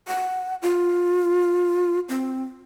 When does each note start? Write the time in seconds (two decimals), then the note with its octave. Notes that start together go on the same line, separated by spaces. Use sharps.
0.08 F#5
0.62 F4
2.09 C4